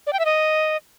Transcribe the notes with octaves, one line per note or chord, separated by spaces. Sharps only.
D5
G5
E5
D#5